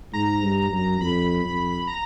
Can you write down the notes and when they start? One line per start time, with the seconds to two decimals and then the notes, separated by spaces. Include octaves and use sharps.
0.13 G#2 A#5
0.42 G2
0.71 F#2
1.01 F2 B5
1.44 F2
1.87 A#5